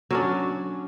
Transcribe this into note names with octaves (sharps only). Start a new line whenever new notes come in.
F#3 C#4 D4